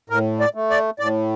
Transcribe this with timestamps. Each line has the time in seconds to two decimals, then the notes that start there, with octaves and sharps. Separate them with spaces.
0.10 A2 A#4
0.40 D5
0.54 A3
0.70 D5
0.99 A2 D5